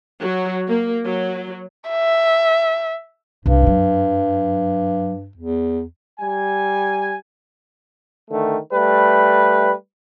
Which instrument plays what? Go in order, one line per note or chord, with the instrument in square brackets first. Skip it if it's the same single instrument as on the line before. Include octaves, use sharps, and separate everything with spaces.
[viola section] F#3
A#3
F#3
[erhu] E5
[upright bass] C2 C3 [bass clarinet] G2
[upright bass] F#2 F#3
[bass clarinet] E2
[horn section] G3 G#5
[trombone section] D3 D#3 A3
G3 A3 B4